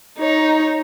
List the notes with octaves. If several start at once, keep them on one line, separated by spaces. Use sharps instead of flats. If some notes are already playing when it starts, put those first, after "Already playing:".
D#4 C#5